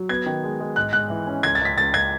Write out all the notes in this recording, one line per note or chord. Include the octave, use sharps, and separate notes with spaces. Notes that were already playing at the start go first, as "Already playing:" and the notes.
Already playing: F#3
B3 G#6
D#3
G#3
G#3
G#2 F#6
G#2 F#6
E3
C#4
C#2 G#6
A6
C#2 B6
C#2 A6
C#2 G#6